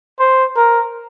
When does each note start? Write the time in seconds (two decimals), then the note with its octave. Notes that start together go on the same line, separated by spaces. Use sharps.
0.19 C5
0.56 A#4